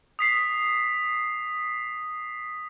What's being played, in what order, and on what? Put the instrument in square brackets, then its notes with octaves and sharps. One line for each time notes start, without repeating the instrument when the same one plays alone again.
[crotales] D#6 B6 C7